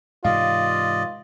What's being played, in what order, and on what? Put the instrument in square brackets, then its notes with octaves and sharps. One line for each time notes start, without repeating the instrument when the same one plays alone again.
[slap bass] G#2 C3 E3 [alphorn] F4 [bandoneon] D5 D#5 [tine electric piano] F5